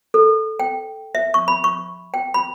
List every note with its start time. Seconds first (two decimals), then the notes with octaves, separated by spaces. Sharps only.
0.14 A4
0.60 G5
1.15 E5
1.34 C#6
1.48 B5
1.64 C#6
2.14 G5
2.34 B5